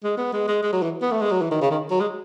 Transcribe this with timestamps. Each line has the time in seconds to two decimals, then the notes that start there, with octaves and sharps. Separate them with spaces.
0.03 G#3
0.17 B3
0.33 G#3
0.48 G#3
0.62 G#3
0.72 F#3
0.82 E3
1.02 B3
1.11 A3
1.21 G#3
1.31 F#3
1.41 E3
1.51 D#3
1.61 C#3
1.70 D#3
1.90 F#3
2.00 G#3